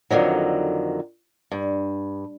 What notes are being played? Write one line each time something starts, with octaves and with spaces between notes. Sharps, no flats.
F2 D3 D#3 F#3
G2